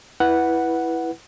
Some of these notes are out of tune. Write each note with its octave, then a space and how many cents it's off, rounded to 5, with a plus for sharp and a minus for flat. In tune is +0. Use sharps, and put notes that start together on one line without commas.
E4 +0 B4 -10 F#5 +0